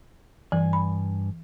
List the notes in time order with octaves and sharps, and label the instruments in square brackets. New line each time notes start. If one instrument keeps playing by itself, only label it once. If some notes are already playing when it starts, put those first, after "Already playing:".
[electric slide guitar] G2 G#5 [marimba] E3
[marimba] B5